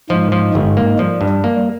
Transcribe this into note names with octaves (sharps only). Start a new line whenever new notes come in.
G#2 F3 G#3
F3
G1 G#2 G#3
A#3
F3 G3
G2
G3
A#3